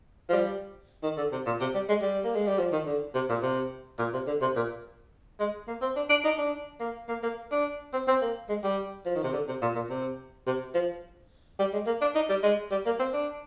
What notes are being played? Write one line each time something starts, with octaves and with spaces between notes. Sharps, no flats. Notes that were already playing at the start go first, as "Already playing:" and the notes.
F3
G3
D#3
D3
C3
A#2
C3
G3
G#3
G3
A#3
G#3
G3
F3
D#3
D3
C3
A#2
C3
A#2
C3
D3
C3
A#2
G#3
A#3
C4
D4
D4
D#4
D4
A#3
A#3
A#3
D4
C4
C4
A#3
G#3
G3
F3
D#3
C3
D3
C3
A#2
A#2
C3
C3
F3
G3
G#3
A#3
D4
D#4
G3
G#3
G3
A#3
C4
D4